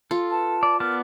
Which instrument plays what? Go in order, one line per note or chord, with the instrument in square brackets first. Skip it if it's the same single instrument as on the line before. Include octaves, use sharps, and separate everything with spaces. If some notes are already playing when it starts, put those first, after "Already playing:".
[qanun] F4 [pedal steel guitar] A4
[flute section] B4 A5
[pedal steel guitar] D5
[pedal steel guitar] B3 D5 A5 [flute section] A#4 F6